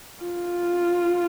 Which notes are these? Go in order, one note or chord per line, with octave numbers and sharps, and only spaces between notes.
F4